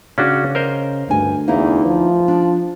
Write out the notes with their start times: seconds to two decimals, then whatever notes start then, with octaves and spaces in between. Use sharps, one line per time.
0.18 C#3 C#4 D4 F#4
0.55 A#4 C5 D#5
1.09 D2 G2 G#5
1.48 E2 A#3 D#4 E4
1.85 F3
2.28 D4